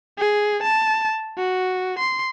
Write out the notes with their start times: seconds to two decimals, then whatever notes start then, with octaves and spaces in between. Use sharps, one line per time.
0.18 G#4
0.63 A5
1.37 F#4
1.98 C6